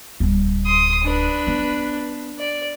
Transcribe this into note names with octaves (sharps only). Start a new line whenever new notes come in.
D1 G3
C6 D#6
D4 B4
B3
D5